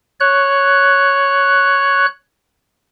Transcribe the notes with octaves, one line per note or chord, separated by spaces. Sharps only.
C#5 F#6